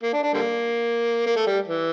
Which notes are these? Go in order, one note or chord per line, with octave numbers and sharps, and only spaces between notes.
A#3
D4
D4
D3 G3 A#3
A#3
A3
G3
E3